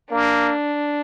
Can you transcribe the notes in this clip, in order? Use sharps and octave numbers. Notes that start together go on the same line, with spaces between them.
A#3 D4